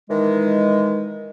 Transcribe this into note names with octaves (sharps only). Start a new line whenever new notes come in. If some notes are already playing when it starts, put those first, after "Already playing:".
D#3 E3 G#3